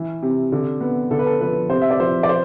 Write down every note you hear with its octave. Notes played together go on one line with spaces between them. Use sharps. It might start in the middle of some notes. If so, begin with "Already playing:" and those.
Already playing: E3
C3
D3
B3
D3 A4
B4
A4
F3 B4
C3 C5
E5
D5
F3 C5
D5
C5